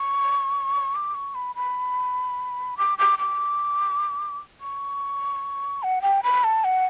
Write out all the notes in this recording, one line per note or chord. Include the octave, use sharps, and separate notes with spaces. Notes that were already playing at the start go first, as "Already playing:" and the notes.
Already playing: C#6
D6
C#6
B5
B5
D6
D6
D6
C#6
F#5
G5
B5
A5
F#5